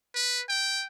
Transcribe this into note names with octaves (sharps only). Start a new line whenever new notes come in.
B4
G5